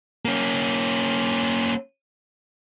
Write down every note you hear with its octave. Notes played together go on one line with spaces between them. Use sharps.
A#3 C#4